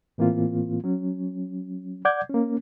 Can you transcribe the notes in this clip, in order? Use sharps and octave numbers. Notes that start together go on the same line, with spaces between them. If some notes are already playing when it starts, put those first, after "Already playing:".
A2 E3 A#3 C4 F4
F#3 C#4
D5 F#5 D6 G6 G#6
A#3 C#4